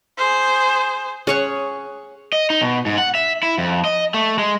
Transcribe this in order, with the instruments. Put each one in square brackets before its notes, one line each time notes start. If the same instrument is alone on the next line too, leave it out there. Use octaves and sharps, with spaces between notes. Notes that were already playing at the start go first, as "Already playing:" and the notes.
[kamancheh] G#4 C5
[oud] C#4 [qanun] G#4 C#5 F#5
[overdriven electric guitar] D#5
D#4
B2
G#2
F#5
E5
E4
F2
D#5
A3
G#3